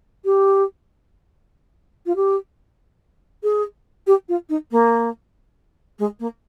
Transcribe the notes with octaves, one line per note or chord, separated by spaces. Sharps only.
G4
F4
G4
G#4
G4
F4
D#4
A#3
G#3
A#3